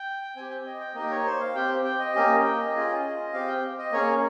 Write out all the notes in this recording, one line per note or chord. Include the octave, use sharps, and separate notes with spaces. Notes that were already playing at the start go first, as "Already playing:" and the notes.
Already playing: G5
C4 G4 G#5
G5
D#5
G5
A#3 D#4 G4 D#5
C#5
C5
F5
C4 G4 G5
G5
D#5
A#3 C#4 G4
G5
D#5
C#4 F4 G#4
C4 G4 F5
G5
D#5
A#3 C#4 G#4 C#5